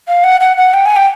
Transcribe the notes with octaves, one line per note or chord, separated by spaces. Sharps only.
F5
F#5
F#5
F#5
G5
G#5
G5